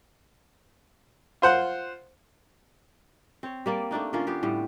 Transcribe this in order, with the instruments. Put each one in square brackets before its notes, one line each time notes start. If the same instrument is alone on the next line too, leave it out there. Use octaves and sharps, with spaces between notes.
[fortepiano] F4 C5 F#5
[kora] C4 C#5
G3 A#3 D5
A3 A#3 D4 D#4
D3 A#3 C#4 F4
B3 F4 G4
A2 G3